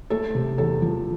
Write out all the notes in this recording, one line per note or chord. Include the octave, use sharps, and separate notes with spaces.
A3 A4
C3
E2 A4
F3